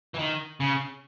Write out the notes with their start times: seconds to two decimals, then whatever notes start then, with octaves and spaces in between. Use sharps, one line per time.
0.14 E3
0.19 D#3
0.60 C#3